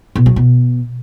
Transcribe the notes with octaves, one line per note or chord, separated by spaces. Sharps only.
B2
F#3
B2